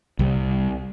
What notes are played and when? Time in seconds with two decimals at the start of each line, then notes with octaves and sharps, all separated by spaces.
0.19 C2 G3